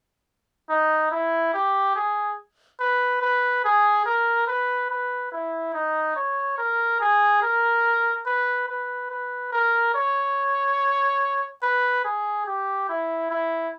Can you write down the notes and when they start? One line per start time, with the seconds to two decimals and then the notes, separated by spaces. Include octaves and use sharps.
0.69 D#4
1.11 E4
1.54 G4
1.95 G#4
2.80 B4
3.22 B4
3.64 G#4
4.05 A#4
4.47 B4
4.90 B4
5.32 E4
5.74 D#4
6.16 C#5
6.58 A#4
7.00 G#4
7.42 A#4
8.26 B4
8.68 B4
9.10 B4
9.52 A#4
9.94 C#5
11.62 B4
12.04 G#4
12.46 G4
12.89 E4
13.30 E4